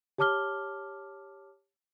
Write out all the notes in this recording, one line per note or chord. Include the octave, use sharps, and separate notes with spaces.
G4 C#5 A5 D6 F6 G7